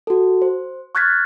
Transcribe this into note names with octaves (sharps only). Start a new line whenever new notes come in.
F#4 A4
C5
C#6 F6 F#6 G#6 A6 B6